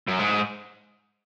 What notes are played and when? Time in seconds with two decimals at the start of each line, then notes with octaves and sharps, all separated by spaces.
0.08 F#2
0.19 G#2